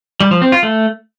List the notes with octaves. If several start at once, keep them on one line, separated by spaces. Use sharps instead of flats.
G3
F3
C4
F4
A3